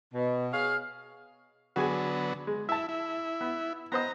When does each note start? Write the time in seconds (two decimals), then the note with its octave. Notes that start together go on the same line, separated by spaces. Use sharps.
0.14 B2
0.53 G#4 C#5 F5
1.76 D3 F#3 B3 F#4 G#4 G#5
2.47 G#3
2.69 E4 E5 A5
2.89 E4
3.41 B3
3.92 B3 C5 D#5 A#5